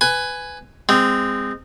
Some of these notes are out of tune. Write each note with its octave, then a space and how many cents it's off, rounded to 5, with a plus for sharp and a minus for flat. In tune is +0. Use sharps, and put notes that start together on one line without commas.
B4 +15 G#5 +0
G#3 -25 C4 -20